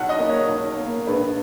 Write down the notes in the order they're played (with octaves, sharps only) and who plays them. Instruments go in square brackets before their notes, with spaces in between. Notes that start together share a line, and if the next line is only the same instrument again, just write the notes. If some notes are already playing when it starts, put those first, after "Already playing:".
Already playing: [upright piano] B1 F#5
D#5
A#3
C#5
B1
A#3
A#1 B4